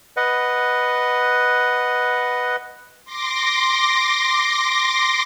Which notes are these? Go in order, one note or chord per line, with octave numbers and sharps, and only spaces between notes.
B4 D#5 F#5
C6 D6 A#6